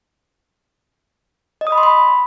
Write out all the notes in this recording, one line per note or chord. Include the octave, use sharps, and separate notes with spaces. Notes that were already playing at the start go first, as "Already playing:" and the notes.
D#5
D#6
B5
C6
B5